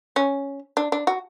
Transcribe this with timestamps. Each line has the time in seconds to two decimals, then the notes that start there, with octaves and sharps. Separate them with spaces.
0.16 C#4
0.77 D4
0.92 D4
1.07 F#4